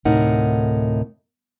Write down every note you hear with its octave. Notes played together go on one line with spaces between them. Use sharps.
D2 A2 C3 D#4 A#4 F#5